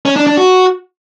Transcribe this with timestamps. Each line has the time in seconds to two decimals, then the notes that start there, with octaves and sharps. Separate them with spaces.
0.05 C#4
0.16 D4
0.27 D4
0.37 F#4